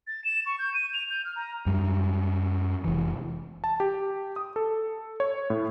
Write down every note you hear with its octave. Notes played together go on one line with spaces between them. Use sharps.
A6
E7
C#6
G6
D#7
F7
G6
F6
A#5
F#2 G3
F1 E3
A5
G4
D#6
A4
C#5
A2